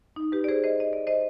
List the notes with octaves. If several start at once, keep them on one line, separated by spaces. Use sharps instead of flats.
D#4
G4 B4
D5
G#4 C5
C5 D#5
D#5
D5
C5 D#5